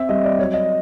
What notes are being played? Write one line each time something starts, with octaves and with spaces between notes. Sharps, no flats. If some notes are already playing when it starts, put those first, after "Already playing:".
Already playing: C4 E5
G3 D#5
D5
F#3 C#5
D#5